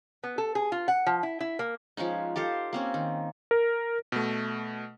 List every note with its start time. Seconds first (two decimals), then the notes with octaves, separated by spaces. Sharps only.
0.23 B3
0.38 A4
0.55 G#4
0.72 F4
0.88 F#5
1.06 F3
1.23 E4
1.40 E4
1.59 A#3
1.97 F3 G#3 C#4 D#4
2.36 G4 A4 C5 F5
2.73 A#3 C4 C#4
2.94 D#3
3.51 A#4
4.12 B2 A3